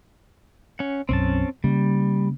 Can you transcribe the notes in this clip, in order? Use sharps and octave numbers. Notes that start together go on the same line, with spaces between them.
C#4 F#5
B1 F#2 C4 C#4 A5
C#3 G3 A#3 C#4